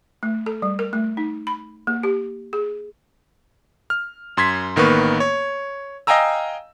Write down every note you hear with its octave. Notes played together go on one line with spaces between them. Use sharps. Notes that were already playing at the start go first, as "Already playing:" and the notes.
A3
A4
G3
A#4
A3
D#4
B5
A#3
G4
G#4
F6
F#2 C6 G#6 B6
A1 D#3 A#3 B3 B4 C#6
C#5
D#5 F5 G5 G#5 A#5 E6